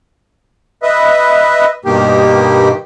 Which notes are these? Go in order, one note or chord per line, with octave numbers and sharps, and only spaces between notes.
B4 D#5 E5
G2 B2 D#3 A#3 G4